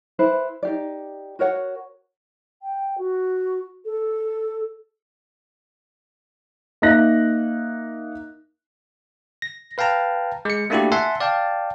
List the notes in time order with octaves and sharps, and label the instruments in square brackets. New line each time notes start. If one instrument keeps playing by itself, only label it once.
[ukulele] E4 B4 C5
D#4 G4 D5
F#4 A#4 C#5 F#5
[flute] G5
F#4
A4
[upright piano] A#3 D#4 E5 F#6 A#6
[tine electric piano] A#6
B4 F5 G5 A5 A#5
G#3 C#7
A3 A#3 D4 E4 F#4 G4
E5 F#5 G#5 A5 C6
D5 F5 G5 A5